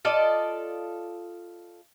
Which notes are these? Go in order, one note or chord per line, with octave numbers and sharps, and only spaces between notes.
F4 A4 D5 D#5